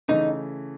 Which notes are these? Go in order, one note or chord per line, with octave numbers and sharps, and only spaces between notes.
C#3 E3 A3 D#4